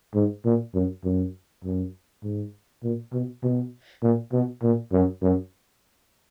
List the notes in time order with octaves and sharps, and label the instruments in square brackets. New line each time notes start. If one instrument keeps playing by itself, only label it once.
[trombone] G#2
A#2
F#2
F#2
F#2
G#2
A#2
B2
B2
A#2
B2
A#2
F#2
F#2